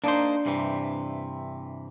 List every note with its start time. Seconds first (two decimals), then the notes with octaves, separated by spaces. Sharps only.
0.04 A#3 D4 D#4 C5
0.46 G2 C3 E3